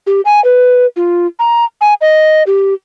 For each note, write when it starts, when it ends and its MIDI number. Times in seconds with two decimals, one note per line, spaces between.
0.07 0.21 67
0.25 0.43 80
0.44 0.86 71
0.96 1.27 65
1.39 1.65 82
1.81 1.94 80
2.01 2.43 75
2.47 2.74 67